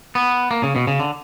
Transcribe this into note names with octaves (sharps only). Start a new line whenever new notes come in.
B3
A#3
C#3
B2
C#3
D3